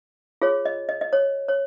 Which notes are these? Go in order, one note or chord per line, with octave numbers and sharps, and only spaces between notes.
F4 G#4 C#5
D#5
D#5
D#5
C#5
C#5